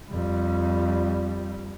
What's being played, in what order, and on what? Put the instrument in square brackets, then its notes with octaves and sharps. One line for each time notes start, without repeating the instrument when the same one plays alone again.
[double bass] F2 G3